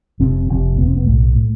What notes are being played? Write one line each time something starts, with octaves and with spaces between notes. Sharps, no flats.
F1 F2 C3 C4
F1 F2 C3
F1 F2 C3 B3
C4
B3
B1 A2 A3
A2